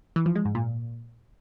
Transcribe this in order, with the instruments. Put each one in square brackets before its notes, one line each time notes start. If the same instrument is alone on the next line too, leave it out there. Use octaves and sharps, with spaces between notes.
[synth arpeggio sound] E3
F3
G#3
G#2
A#2